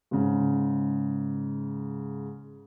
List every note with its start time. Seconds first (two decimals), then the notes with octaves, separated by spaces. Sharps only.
0.11 G#2 C#3